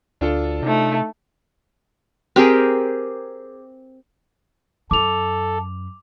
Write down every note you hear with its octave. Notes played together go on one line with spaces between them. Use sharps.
D2 D4 F4 A4
C3 A3 D#4
C4 G4 G#4 A#4
F#2 A4 D6 F7